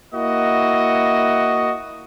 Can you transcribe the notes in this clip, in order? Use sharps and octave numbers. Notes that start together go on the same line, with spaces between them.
A#3 E4 F#4 D#5